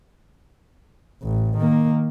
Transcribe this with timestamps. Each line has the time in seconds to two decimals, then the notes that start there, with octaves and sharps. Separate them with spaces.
1.23 A1
1.58 D#3 A#3